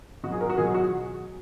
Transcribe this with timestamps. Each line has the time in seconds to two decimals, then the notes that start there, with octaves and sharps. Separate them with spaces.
0.23 B2 F#4
0.27 F#3
0.32 G#4
0.41 A#4
0.50 F#4
0.58 B2 F#3 G#4
0.74 F#4